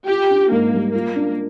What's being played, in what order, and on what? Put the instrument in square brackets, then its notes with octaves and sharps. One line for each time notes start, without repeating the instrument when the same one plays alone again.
[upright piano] F4 [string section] G4
[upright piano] D4
[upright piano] G#2 [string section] A#3
[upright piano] G3
[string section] A#3 [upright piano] F4
[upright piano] D4